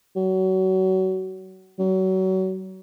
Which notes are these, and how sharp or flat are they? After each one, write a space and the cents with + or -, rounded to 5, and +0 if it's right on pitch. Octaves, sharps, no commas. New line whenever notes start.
F#3 +25
F#3 +30